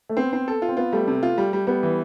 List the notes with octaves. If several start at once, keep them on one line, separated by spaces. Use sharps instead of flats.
A3
B3 C4
C4
A4
F4
C4
B3 F4
G3 A3
C3
F4
G3
G3
G3 B3
E3